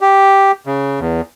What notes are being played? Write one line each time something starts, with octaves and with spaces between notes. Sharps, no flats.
G4
C#3
E2